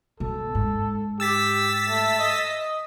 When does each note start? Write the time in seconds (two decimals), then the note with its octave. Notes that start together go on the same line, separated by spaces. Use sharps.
0.20 B2 A4
0.55 G#2
1.20 G4 E6 A6 B6
1.89 A3
2.19 D#5